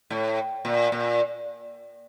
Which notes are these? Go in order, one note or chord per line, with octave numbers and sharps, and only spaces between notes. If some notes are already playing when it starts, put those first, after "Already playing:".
A2
A#2
A#2